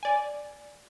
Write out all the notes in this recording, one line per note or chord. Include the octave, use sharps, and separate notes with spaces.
D5 G#5